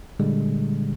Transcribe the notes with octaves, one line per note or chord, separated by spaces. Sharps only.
A#2 D3 G3 G#3